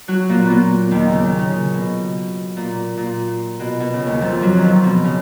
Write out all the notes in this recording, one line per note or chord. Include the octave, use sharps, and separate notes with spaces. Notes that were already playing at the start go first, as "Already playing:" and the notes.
F#3 F#4
A#2 A#3
A#2 A#3 B3
D#2 D#3
C#3
D#3
C#3
B2
A#2
A#2
B2
B2
C#3
D#2 D#3
F2 F3
F#2 F#3
F2 D#3 F3
B2
C#3